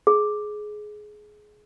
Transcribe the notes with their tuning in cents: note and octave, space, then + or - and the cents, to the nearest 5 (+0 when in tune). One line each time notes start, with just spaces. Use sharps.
G#4 +20